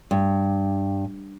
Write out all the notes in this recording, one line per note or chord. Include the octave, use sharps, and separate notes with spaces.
G2